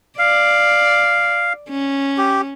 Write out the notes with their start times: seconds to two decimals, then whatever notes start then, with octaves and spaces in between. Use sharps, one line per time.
0.19 D5 F5
1.70 C#4
2.18 G4